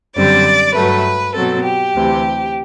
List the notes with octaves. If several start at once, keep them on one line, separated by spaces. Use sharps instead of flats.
F#2 D3 G3 C4 D5
G2 F#3 A3 B4
B2 F#3 C4 A4
G4
D2 C3 E3